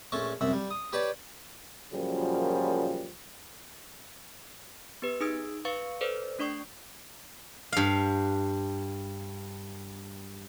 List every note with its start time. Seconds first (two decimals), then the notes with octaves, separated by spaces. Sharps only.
0.12 A#1 A3 C#4 A5 C#6
0.41 C2 F#2 E5 F#5
0.53 G3
0.71 D#6
0.93 G4 B4 C#5 D5 A5
1.91 F#2 A#2 C#3 F3 G3
5.02 B3 G4 B4
5.21 D#4 G#4 D#6 E6 G#6 D7
5.65 B4 F5 C#6 A6 C#7
6.01 A4 B4 C5 D5
6.39 A3 D4 D5 C#6 D#6 C7
7.72 G2 F5